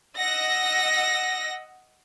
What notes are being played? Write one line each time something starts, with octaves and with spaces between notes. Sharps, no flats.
D#5 F#5 E6 A#6